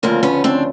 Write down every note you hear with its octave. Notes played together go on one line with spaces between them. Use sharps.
D2 C#3 F3 A#3 C4
B3 C#4
C4 D4